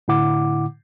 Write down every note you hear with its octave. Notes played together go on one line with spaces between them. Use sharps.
A2 D3 E4 F#5 D6